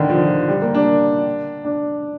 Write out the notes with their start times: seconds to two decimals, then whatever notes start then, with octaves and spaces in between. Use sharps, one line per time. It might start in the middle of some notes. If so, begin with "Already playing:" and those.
Already playing: D3 D#3
0.09 F3
0.48 G3
0.62 A#3
0.74 D4
1.65 D4